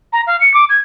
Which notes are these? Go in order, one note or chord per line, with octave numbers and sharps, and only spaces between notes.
A#5
F5
C#7
D6
G#6